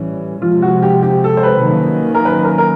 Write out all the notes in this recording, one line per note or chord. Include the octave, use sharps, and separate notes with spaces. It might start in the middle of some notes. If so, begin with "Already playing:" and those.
Already playing: A2 E3 G3 C#4
C3 F3 G#3 F4
F#4
G4
G4
A4
C5
B4
D#3 F#3 A#3 C#4
A#4
B4
A#4
A#4